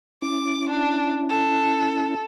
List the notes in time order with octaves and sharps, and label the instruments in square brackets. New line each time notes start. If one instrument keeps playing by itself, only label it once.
[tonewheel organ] C#4 E4 [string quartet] D6
[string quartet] D4
A4